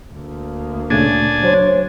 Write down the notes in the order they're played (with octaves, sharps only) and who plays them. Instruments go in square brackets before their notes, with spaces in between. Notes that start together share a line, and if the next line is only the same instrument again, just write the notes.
[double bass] D2 A#3
[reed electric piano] A#2 C#3 A3 [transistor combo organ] D4 G#5
[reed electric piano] F#3 [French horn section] C5 C#5